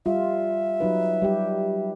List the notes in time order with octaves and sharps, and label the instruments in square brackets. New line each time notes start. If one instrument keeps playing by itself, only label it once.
[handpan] G3 F4 [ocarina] E5
[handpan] F#3 D#4 B4
G3 G4